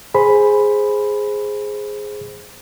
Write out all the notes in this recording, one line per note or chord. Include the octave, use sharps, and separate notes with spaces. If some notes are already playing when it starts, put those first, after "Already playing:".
G#4 C5 B5